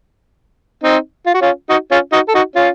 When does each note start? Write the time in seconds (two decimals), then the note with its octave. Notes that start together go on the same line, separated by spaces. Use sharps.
0.83 C4 D#4
1.26 F4
1.34 F#4
1.41 C#4 F4
1.70 D#4 F#4
1.91 C#4 F4
2.12 D#4 F#4
2.28 A4
2.35 D#4 F#4
2.56 C#4 F4